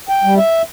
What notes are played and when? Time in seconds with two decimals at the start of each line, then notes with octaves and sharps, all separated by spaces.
0.09 G5
0.24 G3
0.37 E5